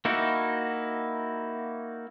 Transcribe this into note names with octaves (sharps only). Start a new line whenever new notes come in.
A#3 D#4 E4 F#4